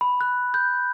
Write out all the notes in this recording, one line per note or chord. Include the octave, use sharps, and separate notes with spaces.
B5
F#6
G6